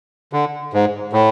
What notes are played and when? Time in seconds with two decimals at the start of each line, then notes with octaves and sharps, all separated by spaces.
0.33 D3
0.73 G#2
1.13 A2